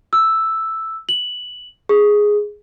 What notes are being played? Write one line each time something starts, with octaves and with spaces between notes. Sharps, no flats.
E6
F#7
G#4